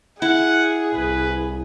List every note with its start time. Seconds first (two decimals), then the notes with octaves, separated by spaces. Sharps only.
0.22 E4 G#4 F#5
0.94 C2 B4